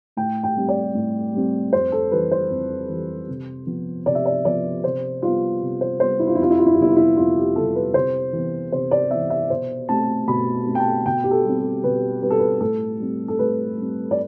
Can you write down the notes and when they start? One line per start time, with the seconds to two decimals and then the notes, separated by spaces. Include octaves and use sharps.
0.17 A2 G5
0.43 G5
0.57 G3 C4
0.68 D5
0.95 A2
1.34 G3 C4
1.73 F2 C5
1.92 A4
2.12 E3 G3 B4
2.31 C5
2.50 F2
2.89 E3 G3
3.28 C3
3.67 F3 B3
4.06 C3 D5
4.15 E5
4.26 D5
4.45 F3 B3 D5
4.84 C3 C5
5.23 G3 B3 F4
5.61 C3
5.81 C5
6.00 G3 B3 C5
6.19 E4
6.27 F4
6.35 E4
6.39 F2 F4
6.50 E4
6.59 F4
6.66 E4
6.74 F4
6.78 C3 G3 B3 E4
6.89 F4
6.96 E4
7.17 F2 F4
7.37 G4
7.55 C3 G3 B3 A4
7.75 B4
7.94 C3 C5
8.33 E3 B3
8.72 C3 C5
8.91 D5
9.11 E3 B3 E5
9.30 E5
9.50 B2 C5
9.89 A3 C4 A5
10.27 B2 B5
10.67 A3 C4
10.75 G5
10.80 A5
11.06 B2 G5
11.24 G4
11.31 A4
11.45 G3 C4
11.58 A4
11.84 B2 B4
12.22 G3 C4 B4
12.30 A4
12.39 B4
12.61 A2 A4
13.00 G3 C4
13.28 A4
13.38 A2 B4
13.78 G3 C4
14.11 D5